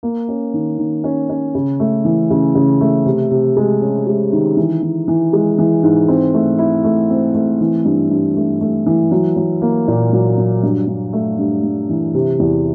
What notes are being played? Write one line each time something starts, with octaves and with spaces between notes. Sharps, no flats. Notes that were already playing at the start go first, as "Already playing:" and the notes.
A#3
C#4
D#3
D#3
C#4
C#4
C#3
A3
E3
C#3
C#3
A3
C3
C3
G#3
C#4
G#3
D#3
E3
E3
E3
G#3
E3
G#2
C4
A3
E4
A3
C4
A3
E3
G2
G2
A3
A3
E3
F#3
F#3
A#3
A#2
F#3
F#3
G2
G2
A3
G2
G2
E3
C3
E2